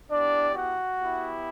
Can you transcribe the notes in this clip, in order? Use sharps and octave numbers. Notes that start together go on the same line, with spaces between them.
B3 D4 E4 G4 D5
F#4 F#5
B3 E4 G4